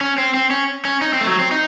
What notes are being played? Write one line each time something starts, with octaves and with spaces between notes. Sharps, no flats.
C#4
C4
C4
C#4
C#4
D#4
C4
A3
F#3
C4
D#4